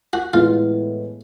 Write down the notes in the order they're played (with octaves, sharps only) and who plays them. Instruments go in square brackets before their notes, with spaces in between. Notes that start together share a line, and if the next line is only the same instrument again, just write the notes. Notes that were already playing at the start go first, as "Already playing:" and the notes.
[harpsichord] F#4
[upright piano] A2 E3 G#3 B3 [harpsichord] F4